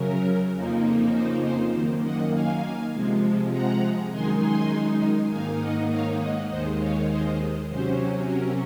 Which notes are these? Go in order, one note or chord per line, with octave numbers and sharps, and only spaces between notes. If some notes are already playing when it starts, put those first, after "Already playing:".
Already playing: F#2 C#3 F#3 C#4 A#4
F2 C#3 F3 A#3 D#4
C5
C5
F#2 D#3 A#3
D#5 F#5
F5 G#5
C3 F3 G#3
F#5 A#5
F#2 D#3 G#3 D#4 G#5 C6
G#5 C6
G#2 D#3 A#3 D#4 F5 G#5
D#5 F#5
C#5 F5
D#5 F#5
D#2 D#3 G#3 C5 D#5
C#5 F5
C5 D#5
C3 F#3 C#4 C5
A#4